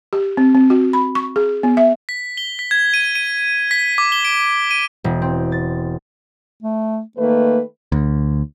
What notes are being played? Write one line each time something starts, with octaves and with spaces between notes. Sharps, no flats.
G4
C4
C4
F#4
B5
C#6
G#4
B3
E5
B6
G7
B6
G#6
D#7
D#7
B6
D6
G7
D7
D#7
E1
C4
A6
A3
D#3 A3 A#3 B4
D2